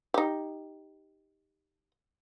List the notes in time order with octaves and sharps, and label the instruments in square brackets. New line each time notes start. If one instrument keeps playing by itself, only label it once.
[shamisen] D#4 G4